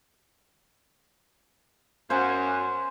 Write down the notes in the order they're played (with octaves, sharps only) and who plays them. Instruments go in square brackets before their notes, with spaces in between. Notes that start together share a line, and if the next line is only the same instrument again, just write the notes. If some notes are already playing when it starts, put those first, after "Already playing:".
[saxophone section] F#2 [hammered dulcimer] C5 F#5 G#5